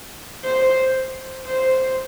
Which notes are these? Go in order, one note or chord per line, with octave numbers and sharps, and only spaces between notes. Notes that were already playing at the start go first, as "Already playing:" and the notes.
C5
C5